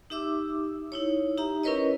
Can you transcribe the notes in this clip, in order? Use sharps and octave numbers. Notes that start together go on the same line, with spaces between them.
D#4 G4 E5 D6 E6
D#4 E4 C#5
D#4 G4 E5 A#5
C#4 E4 A#4 B4 C#5 D#5